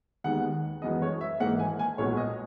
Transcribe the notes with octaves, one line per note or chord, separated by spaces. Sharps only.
D#2 D#3 G#3 B3 F#5
F#2 E3 G#3 B3 D#5
C#5
E5
G#1 G#2 E3 A#3 F#5
G#5
G#5
B1 A#2 G#3 B3 C#5
D#5